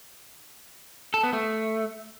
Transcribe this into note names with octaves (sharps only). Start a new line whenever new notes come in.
A4
B3
A3